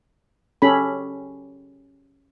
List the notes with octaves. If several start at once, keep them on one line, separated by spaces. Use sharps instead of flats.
C#4 G4 A4 B5